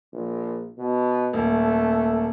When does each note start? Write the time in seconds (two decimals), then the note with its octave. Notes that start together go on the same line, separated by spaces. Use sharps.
0.13 A#1
0.78 B2
1.33 D#1 A3